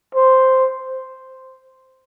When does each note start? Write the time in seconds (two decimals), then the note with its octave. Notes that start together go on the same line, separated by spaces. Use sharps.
0.15 C5